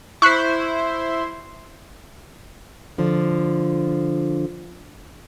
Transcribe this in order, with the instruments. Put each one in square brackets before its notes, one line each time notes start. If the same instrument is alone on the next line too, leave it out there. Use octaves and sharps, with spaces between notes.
[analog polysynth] E4 C5 [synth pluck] C#6 F#6 B6
[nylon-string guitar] D3 F3